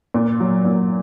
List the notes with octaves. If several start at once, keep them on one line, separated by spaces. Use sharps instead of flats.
A#2
F#3
A#2